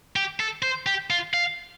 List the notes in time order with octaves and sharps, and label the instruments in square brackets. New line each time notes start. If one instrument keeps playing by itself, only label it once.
[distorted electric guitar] G4
A4
C5
G4
F4
F5